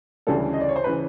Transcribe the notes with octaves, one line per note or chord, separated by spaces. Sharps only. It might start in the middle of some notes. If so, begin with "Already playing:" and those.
D2 C#3 E3 G3 A4
D#5
D5
C#5
C5
C#3 E3 B4